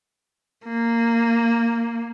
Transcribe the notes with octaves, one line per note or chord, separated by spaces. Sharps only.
A#3